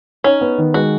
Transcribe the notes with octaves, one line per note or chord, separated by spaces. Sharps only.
C#4 D#4
B3
D#3
G#3 F#4